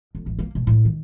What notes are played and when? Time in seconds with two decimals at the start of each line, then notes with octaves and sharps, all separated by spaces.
0.15 F2
0.26 A1
0.39 A#3
0.55 B2
0.67 A2
0.85 D#3